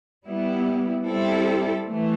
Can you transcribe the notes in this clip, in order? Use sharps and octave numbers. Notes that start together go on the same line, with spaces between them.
G3 B3 E4
G3 C4 E4 A4
E3 A3